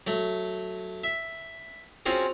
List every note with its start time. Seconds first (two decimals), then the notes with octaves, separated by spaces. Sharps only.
0.07 F#3 A3
1.04 E5
2.06 C4 C#4 F4 F#4 G#4